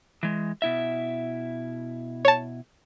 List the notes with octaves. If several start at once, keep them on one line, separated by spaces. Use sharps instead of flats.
E3 G#3
B2 E4 E5
C#5 A5